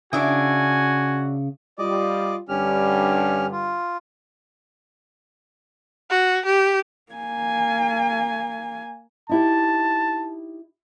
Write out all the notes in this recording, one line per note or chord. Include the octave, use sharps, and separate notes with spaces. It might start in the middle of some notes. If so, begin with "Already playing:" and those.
C#3 D4 E4 F#4 G#5 D#6
G3 F4 D5 D#5 D6
G2 D3 G3 C#4 G4 F6
F4
F#4
G4
A#3 G#5
D#4 E4 G4 A5